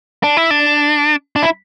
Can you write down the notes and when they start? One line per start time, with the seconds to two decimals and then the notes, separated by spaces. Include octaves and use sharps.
0.23 D4
0.37 E4
0.51 D4
1.36 D4
1.43 E4